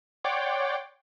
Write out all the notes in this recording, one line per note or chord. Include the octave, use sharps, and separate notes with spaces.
C#5 D5 F#5 G5 C6 D6